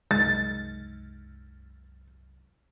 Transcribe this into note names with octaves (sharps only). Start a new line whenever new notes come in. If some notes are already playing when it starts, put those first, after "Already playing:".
C2 F#2 G#3 A6